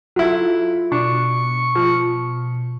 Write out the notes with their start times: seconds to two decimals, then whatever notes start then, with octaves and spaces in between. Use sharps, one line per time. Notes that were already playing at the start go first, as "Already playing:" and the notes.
0.16 F#3 E4 F4 A4
0.92 B2 D4 C#6
1.75 F3